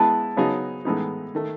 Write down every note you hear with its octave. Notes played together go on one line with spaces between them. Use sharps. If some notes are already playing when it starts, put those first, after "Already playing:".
Already playing: G#3 B3 E4 B4 A5
C#3 F#3 B3 D#4 G#4
A2 E3 G#3 B3 D#4
D#3 A3